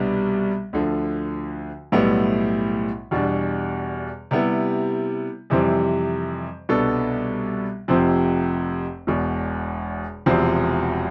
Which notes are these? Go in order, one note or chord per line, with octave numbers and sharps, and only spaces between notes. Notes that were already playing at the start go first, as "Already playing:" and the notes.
Already playing: C2 B2 G3 B3 D4
D2 D3 F3
B1 A2 G3 B3 E4
E2 B2 G3 D4
C3 G3 B3 E4
F2 C3 E3 G3 C4
C2 B2 B3 D4 A4
F1 F2 C3 F3 C4
E1 E2 B2
E1 E2 C3 F3 C4